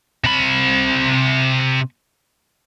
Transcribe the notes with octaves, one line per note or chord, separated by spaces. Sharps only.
C3 B5